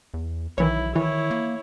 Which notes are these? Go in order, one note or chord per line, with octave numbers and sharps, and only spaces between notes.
E2
B1 D#3 E3 E4 C#5
D#3 E3 E4 C#5
A#3